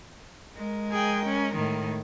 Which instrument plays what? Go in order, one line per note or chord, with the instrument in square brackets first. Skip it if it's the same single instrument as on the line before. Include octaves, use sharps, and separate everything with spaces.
[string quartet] G#3 A#4
[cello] G#4 G5
C#4
A2 D#3